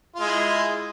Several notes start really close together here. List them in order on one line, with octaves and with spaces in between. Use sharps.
F4 G#3 E4